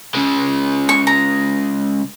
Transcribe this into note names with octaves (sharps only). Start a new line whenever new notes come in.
C#3 G#3
C#6
A#5